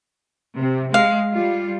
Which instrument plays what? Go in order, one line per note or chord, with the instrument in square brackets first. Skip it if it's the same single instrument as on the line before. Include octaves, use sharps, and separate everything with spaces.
[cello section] C3
[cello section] G#3 [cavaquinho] F5
[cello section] G3 F4